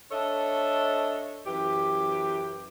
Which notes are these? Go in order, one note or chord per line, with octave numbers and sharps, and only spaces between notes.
D4 A4 C#5 D#5 E5
F#2 E3 G4